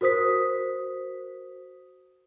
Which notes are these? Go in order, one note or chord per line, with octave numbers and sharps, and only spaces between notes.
F#4 A#4 C5 D#6 B6